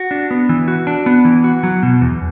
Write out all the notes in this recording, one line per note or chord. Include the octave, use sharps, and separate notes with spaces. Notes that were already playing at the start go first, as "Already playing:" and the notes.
Already playing: F#4
D4
B3
E3
F#4
D4
B3
E3
F#4
F#3
B2
E2